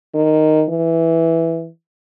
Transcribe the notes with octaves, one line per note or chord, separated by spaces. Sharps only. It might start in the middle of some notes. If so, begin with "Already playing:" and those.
D#3
E3